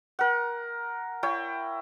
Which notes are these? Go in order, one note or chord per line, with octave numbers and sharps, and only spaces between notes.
A#4 F#5
E4 C#5 G5